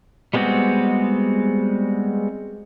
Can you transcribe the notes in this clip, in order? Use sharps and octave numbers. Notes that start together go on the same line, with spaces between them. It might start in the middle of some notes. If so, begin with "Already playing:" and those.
G3 G#3 B3 C4 F#4